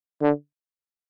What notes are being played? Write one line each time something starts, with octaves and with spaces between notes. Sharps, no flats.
D3